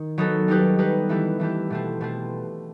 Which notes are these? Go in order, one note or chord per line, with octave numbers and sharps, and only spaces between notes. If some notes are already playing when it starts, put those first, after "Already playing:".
Already playing: D#3
F#3 B3 D#4 A4
G3 D#4 G4 B4
G3 D#4 G4 B4
E3 A3 E4 G4
E3 A3 E4 G4
B2 A3 C4
B2 A3 C4